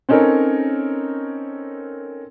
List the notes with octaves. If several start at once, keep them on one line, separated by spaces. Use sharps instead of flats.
C4 C#4 D#4 A4 A#4 C#5